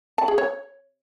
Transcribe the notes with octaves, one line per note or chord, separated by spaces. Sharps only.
A5
G#4
C#5